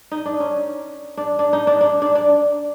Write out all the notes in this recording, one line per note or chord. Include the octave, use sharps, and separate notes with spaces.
D#4
D4
C#4
D4
D4
D#4
D4
D4
D4
D4